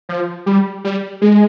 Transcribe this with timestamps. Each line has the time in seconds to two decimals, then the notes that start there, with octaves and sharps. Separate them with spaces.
0.09 F3
0.46 G3
0.84 G3
1.22 G#3